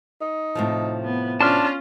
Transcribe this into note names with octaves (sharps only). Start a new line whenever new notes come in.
D#4
A2 C3 F3
B3
C#4 D4 F4 A5 C6 F6